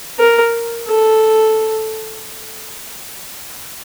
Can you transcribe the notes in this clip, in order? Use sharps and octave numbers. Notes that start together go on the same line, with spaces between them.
A#4
A4